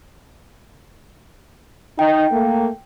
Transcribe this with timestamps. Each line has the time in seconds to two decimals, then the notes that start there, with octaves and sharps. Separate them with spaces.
1.99 D#4 G5
2.31 A3 A#3